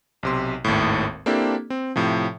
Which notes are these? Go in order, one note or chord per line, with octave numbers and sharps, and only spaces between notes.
B1 C3 C6
G#1 D#2 A2
A#3 C4 D4 E4 G4 A4
C4
A2 C3 F3